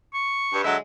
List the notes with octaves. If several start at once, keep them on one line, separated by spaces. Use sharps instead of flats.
C#6
G2
D3 F#3 G#3 E5